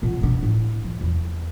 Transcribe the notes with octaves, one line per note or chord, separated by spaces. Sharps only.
A#2 B3
B2 D4
A2
F3
E2